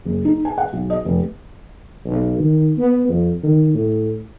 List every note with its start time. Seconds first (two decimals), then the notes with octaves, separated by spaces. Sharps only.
0.05 F#1
0.25 D#4
0.45 G#5
0.58 F#5
0.73 B1
0.90 D#5
1.05 F1
2.05 B1
2.40 D#3
2.78 B3
3.09 F2
3.43 D#3
3.75 A2